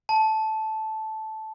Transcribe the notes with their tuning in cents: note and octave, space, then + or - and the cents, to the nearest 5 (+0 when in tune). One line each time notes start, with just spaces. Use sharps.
A5 -10